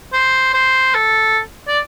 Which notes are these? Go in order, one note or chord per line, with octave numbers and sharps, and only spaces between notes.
C5
C5
A4
D5